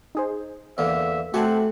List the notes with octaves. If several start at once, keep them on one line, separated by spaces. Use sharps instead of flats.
D#4 G#4 C5
E2 D3 A#3 E5
A3 C4 F#4 G4 F#5 G#5 A5 F#6